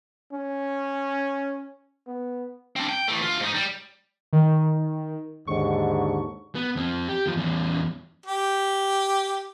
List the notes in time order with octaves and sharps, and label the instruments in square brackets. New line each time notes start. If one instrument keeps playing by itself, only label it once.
[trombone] C#4
B3
[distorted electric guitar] C4 D4
G5
E3 A3
D2 F4
G#2 D#4
G3
[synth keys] D#3
[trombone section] D#2 G#2 D3 [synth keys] C#6
[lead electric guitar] B3
F2 C4
G4
E2 F3
E2 C#4
[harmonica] G4